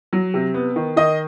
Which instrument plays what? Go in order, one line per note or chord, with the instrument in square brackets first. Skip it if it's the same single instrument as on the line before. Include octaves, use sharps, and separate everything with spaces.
[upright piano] F#3
C3
B3
D#3
D#3 D#5